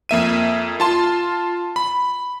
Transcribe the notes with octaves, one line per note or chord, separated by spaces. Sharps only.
F2 A#3 E5 D#7
F4 A5 C6
B5